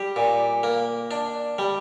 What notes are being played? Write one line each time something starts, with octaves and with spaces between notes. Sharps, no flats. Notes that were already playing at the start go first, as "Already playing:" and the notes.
Already playing: G3 G4
A#2
A#3
D4
G3